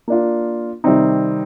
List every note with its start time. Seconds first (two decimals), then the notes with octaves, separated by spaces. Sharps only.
0.08 A#3 D4 F4
0.84 C3 D#3 G3 C4 D#4